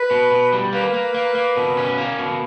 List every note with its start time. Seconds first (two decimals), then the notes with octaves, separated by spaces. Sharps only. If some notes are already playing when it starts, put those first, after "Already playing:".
Already playing: B4
0.11 B2
0.31 B2
0.53 G3
0.73 A#3 B4
0.94 A#3
1.14 A#3
1.35 A#3
1.56 B2
1.77 C#4
1.98 A#3
2.19 B2